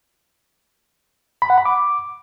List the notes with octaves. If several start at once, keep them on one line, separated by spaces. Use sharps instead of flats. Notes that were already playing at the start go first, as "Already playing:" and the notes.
B5
F#5
B5
D6